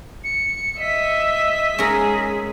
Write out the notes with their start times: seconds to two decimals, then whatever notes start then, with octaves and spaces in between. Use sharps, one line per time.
0.24 C#7
0.80 D#5 E5 B6
1.79 G#3 C#4 G#4 A#4